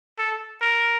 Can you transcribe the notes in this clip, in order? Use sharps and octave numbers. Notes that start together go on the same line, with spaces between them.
A4
A#4